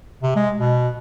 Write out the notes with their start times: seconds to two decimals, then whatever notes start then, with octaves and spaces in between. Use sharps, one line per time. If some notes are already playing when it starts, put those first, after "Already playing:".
0.23 C3
0.36 G#3
0.59 B2